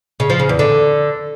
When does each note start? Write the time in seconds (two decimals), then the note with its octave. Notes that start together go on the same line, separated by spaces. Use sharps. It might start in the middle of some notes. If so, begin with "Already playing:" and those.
0.20 C#3
0.30 F3
0.39 C#3
0.49 E2
0.59 D3